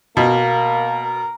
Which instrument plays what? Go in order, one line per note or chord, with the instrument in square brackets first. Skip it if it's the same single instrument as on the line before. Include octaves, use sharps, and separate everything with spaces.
[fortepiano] B2 [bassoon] A#3 [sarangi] A#4